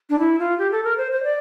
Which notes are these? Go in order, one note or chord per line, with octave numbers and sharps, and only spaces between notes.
D4
E4
F4
G4
A4
A#4
C5
C5
D5